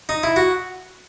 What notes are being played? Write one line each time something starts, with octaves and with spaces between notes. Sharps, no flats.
D#4
E4
F#4